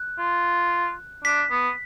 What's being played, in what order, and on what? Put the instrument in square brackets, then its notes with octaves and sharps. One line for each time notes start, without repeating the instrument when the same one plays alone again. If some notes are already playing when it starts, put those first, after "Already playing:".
Already playing: [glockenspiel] F#6
[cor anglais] F4
[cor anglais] D4 [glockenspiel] B6
[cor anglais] B3